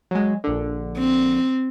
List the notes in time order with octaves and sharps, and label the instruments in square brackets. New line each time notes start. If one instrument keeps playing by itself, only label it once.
[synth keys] F#3 G#3
A#1 D3
[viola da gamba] C4